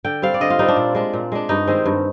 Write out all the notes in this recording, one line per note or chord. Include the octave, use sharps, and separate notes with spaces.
D3 G5
G3 C4 F5
D5
D3 D#5
F4
G3 C4 D#4
D4
A#2
G#3 D4
A#2
G#3 D4
G2 D#4
D#3 G#3 C4
G2